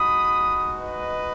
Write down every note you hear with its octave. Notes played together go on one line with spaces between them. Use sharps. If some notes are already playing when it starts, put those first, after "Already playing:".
Already playing: G#3 D#4 F#4 B5 D#6
B4 D#5